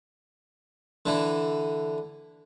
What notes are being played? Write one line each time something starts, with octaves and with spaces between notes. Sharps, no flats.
D3 E3